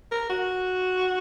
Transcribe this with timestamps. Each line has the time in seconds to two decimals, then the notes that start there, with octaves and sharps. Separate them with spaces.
0.11 A#4
0.29 F#4